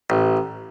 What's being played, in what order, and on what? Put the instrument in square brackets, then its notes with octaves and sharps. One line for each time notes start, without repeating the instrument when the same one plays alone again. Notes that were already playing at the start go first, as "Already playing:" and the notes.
[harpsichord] A1